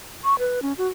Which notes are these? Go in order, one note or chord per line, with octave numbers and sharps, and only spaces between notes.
C#6
B4
C#4
F#4